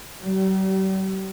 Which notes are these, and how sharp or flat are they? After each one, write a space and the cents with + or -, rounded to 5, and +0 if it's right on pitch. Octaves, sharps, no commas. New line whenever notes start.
G3 -45